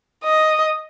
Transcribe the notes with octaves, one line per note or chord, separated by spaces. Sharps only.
D#5